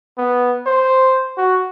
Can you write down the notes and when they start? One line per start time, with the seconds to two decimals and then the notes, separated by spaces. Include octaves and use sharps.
0.18 B3
0.66 C5
1.38 F#4